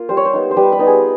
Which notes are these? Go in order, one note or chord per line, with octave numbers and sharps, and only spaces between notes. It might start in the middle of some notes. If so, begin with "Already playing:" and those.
Already playing: A#3 F4
G3 C5
C#5
C5
B3 D#4
C5
G3 B4
B4
B3 D#4
G#4